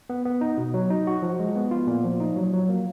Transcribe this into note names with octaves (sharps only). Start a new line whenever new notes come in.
B3
B3
D#4
B2
F#3
D#4
F#4
F3
G#3
B3
F4
A#2
F3
D#4
F#3
F#3
A#3